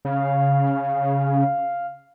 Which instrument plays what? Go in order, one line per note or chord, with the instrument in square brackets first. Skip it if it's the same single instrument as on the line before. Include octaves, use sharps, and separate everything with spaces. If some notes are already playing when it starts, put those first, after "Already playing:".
[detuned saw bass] C#3 [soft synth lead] F5